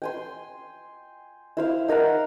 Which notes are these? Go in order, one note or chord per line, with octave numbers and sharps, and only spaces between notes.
G5 G#5 C6
E4 C5 F5
D#4 A#4 F5 F#5